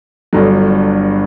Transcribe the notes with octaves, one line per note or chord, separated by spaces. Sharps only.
G1 G2 D3 F#3